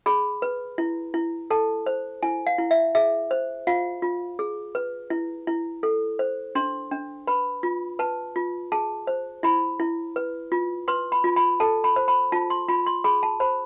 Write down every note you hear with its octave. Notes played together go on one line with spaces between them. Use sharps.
G#4 B5
B4
E4
E4
A4 A5
C5
E4 G#5
F5
E4
E5
G#4 E5
C5
F4 F5
F4
G#4
B4
E4
E4
A4
C5
D4 C6
D4
B4 B5
F4
B4 A5
F4
G#4 A5
C5
E4 B5
E4
B4
F4
B4 C6
B5
F4
B5
A4 A5
B5
C5
B5
F4 A5
C6
F4 B5
C6
G#4 B5
A5
C5 B5